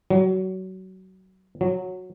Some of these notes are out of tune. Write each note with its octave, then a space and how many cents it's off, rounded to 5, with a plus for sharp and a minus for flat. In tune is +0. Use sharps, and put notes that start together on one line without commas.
F#3 +20
F#3 -15